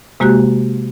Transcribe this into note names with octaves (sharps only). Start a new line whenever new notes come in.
C3 G#3 A#3 F#4 G4 F#6